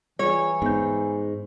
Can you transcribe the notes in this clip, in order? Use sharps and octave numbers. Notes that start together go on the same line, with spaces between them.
E3 G3 F4 G#4 C#5
G#2 B3 G6